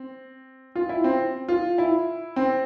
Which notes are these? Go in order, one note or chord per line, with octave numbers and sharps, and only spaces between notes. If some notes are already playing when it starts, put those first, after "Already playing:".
Already playing: C4
F4
E4
C4
F4
E4
C4